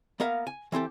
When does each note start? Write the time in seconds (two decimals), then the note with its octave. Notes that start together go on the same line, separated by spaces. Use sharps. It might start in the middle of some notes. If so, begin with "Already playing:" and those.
0.20 A#3 B3 A#4 E5 F5
0.47 G#5
0.72 E3 C4 G4 A4